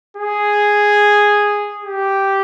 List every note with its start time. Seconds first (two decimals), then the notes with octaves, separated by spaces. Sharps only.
0.17 G#4
1.85 G4